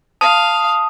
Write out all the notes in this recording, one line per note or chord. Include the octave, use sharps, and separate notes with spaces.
F5 A5 D#6